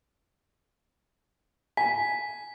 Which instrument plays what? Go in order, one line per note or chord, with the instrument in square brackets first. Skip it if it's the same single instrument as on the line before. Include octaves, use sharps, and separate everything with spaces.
[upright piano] G#5 [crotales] B6